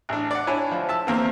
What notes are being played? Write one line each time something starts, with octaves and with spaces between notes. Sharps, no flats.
A1 D4
D5 F#5
D4 E4 C#5 G#5
F3
E5 A5 E6
E2 A#3 C4